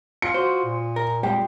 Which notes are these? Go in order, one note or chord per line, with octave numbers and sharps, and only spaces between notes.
F4 C#7
F4 F#4 C5 D#6
A#2
A#4
G3 G#3 G5